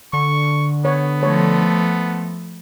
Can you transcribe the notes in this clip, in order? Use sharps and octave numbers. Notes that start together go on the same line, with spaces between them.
D3 C#6
B3 C#5
F3 A3 C#5